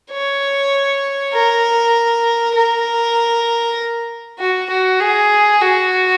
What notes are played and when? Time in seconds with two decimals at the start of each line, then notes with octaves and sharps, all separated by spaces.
0.11 C#5
1.34 A#4
2.55 A#4
4.39 F#4
4.70 F#4
5.00 G#4
5.61 F#4